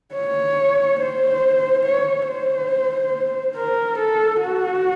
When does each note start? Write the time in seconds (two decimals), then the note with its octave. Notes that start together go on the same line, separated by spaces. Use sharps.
0.15 C#5
1.00 C5
1.85 C#5
2.28 C5
3.56 A#4
3.99 A4
4.41 F#4